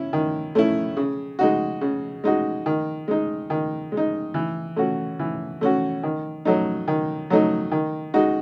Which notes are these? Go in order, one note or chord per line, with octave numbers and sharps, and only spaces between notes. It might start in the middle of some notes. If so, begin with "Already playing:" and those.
Already playing: C#4 E4
D#3
A3 C#4 E4
C#3
G#3 D#4 F#4
C#3
G#3 D#4 F#4
D#3
G#3 D#4
D#3
G#3
D#4
E3
A3 C#4 F#4
E3
A3 C#4 F#4
D#3
F#3 A3 D#4
D#3
F#3 A3 D#4
D#3
G#3 D#4 F#4